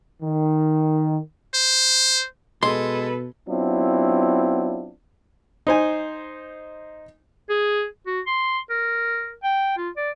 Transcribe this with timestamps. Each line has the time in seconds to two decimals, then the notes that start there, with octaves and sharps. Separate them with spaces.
0.23 D#3
1.54 C5
2.63 B2 G#3 A4 B4 C6
3.48 F#3 B3 C4 D4 E4 F4
5.67 D#4 C5 G#5
7.49 G#4
8.07 F#4
8.27 C6
8.70 A#4
9.43 G5
9.77 F4
9.97 D5